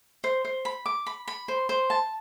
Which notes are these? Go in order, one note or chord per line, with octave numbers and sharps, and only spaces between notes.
C5
C5
B5
D6
B5
B5
C5
C5
A5